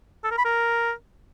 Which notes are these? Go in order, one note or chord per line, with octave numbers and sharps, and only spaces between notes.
A4
A#4
B5
A#4